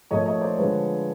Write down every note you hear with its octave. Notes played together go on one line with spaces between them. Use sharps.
A#2 F3 A3 C#5 D#5
C#5 D#5
C5 D5
D3 F3 G#3 B4 C#5